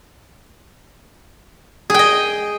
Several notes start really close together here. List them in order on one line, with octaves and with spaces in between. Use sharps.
G#4 G5 D#5